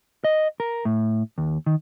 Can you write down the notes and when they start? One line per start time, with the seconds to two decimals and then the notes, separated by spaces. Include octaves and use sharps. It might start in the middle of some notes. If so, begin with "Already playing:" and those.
0.24 D#5
0.60 A#4
0.85 A2
1.38 D#2
1.66 D#3